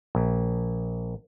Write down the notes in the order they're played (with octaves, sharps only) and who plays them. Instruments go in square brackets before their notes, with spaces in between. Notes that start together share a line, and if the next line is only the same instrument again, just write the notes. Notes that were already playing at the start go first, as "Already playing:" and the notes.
[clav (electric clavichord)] A#1